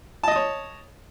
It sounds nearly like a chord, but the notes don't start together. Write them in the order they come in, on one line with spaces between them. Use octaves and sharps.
A5 D#5 D#6 C#5